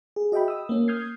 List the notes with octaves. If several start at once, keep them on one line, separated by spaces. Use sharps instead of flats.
G#4
F#4 D#5 E5 G5 B5
D#6 E6
A#3 C#4
D#6 F6 G6 G#6 C7